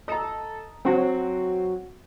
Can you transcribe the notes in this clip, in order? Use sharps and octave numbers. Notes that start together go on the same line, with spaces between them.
A4 D#5 A#5
F#3 C4 F#4